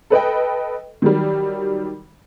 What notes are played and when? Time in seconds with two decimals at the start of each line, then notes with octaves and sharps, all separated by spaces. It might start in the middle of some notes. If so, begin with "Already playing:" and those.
0.10 A4 B4 D#5 G5
1.02 D#3 F#3 G3